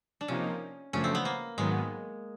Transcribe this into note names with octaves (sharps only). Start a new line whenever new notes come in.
D4
C3 F3 A#3 C#4 D#4
F#2 C#3 F3 A3 C#4 D4
C4
B3
A#3
G#2 D#3 F#3 G#3 B3